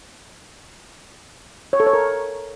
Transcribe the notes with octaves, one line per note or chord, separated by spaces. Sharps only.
C#5
A4
C#5
A#4